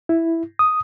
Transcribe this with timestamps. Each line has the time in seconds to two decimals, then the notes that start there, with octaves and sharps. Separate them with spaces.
0.09 E4
0.59 D#6